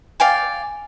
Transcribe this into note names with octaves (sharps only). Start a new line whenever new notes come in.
D5 F5 G5 G#5